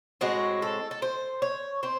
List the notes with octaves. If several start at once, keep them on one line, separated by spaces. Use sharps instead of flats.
A2 G#3 C4 F#4
A4
A4
C5
C#5
C4 C5